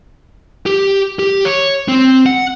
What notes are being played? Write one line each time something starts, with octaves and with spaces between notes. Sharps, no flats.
G4
G4
C#5
C4
F#5